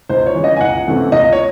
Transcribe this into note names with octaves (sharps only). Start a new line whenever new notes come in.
C#2 C5
C#5
C#3 E3
D#5
G#5
C#2 F#5
C3 E3 A3 C#4
C#2 D#5
C#5